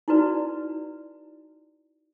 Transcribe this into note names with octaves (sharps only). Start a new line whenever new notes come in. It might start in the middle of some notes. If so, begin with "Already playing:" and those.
D#4 E4 F#4 B4 D5